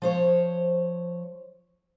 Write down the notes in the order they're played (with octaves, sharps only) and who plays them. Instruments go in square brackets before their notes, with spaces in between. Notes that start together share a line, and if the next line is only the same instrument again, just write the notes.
[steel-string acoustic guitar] F3 C5 C#5